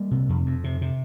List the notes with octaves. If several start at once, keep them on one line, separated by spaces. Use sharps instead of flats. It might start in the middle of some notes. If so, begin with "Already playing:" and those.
Already playing: G3 A#3
C3
F2
F2
C3
C3